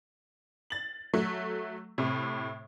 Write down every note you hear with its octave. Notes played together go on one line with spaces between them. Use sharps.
A6 F#7
F#3 A3
A2 C3